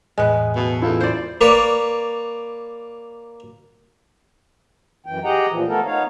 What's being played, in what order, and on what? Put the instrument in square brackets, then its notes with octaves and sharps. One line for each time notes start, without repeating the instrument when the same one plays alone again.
[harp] E2 A2 [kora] G#3 B4
[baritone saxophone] B2 [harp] A3 E5
[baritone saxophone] E2 [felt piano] E4 F4 A4
[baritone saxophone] F#2 [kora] C5 D5
[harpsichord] A#3 B4 C#5 D5
[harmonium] F#2 E3 G5
G4 G#4 D#5 F#5 G5 A#5
A#2 E3 F3
A3 B3 A4 A#4
B3 D#4 C#5 F5